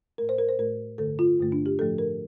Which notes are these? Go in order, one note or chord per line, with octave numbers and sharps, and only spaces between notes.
A2 A3 A#4
C5
A#4
C5
A2 A3 A#4
G2 D3 A3 A4
F4
G2 D3 A3
D4
G4
A2 F3 A3 A4
A#4